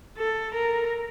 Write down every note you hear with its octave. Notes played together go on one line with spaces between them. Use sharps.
A4
A#4